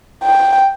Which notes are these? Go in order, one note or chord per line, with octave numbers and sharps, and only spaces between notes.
G5